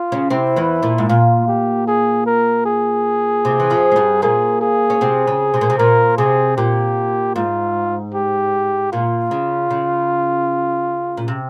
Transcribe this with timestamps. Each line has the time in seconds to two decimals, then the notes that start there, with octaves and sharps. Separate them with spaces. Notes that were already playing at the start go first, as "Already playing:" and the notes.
Already playing: F4
0.12 C#3 C#4
0.30 C3 C4 E4
0.56 E2 E3
0.83 A#2
0.98 G#2
1.09 A#2 F4
1.48 G4
1.87 G#4
2.26 A#4
2.66 G#4
3.45 C3
3.60 E3
3.70 F2 F3
3.92 G#3
3.96 G2 G3
4.22 A#2 A#3 G#4
4.61 G#4
4.90 C#4
5.01 C3 C4
5.27 C#3
5.54 C3
5.61 A#2
5.70 C3
5.79 A#2 A#4
6.18 C3 G#4
6.57 A#2 G4
7.36 G#2 F4
8.14 G4
8.92 A#2 F4
9.31 C#3
9.70 C#3
11.17 A#2
11.28 C3